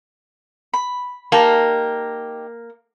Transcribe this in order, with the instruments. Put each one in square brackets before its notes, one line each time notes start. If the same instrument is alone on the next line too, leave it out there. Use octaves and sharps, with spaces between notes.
[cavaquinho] B5
[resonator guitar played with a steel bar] A#3 [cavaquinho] D#4 G4 A5